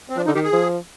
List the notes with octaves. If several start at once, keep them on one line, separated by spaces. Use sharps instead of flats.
C4
F3 D4
D3 D#4
D#3 G4
G#4
F3